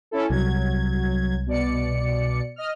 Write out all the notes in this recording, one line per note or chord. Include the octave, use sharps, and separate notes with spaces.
C#4 E4 A4
C2 F#3 G#6
B2 D5 C#7
D#5 F6